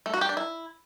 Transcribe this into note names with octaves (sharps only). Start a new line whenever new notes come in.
A3
F#4
G4
D4
E4